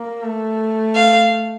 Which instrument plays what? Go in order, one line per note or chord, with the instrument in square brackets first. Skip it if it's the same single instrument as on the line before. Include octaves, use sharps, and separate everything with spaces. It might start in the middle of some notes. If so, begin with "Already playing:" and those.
Already playing: [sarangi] A#3
A3
[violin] F5